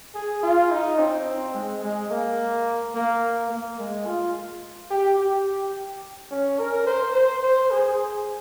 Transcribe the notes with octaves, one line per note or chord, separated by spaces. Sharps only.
G#4
F4
D#4
C4
G#3
G#3
A#3
A#3
A#3
G#3
F4
G4
G4
C#4
A#4
C5
C5
C5
G#4